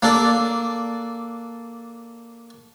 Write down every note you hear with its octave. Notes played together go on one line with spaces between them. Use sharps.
A#3 D4 A4